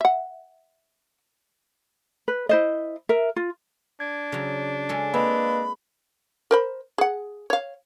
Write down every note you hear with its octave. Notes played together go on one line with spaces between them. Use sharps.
E5 F#5
B4
E4 C5 D#5
A#4 E5
F4
D4 G#6
C#3 F#3
G#3 C#4 A4
A#3 C4 B4 D#5 B5
A#4 C5 B5
G#4 F#5
C#5 F5